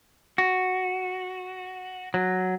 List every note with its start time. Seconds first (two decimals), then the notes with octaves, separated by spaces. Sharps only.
0.38 F#4
2.14 F#3